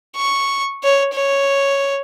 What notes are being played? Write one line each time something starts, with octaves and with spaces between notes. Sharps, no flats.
C#6
C#5
C#5